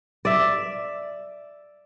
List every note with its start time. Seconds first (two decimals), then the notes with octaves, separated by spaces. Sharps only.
0.25 D5 E5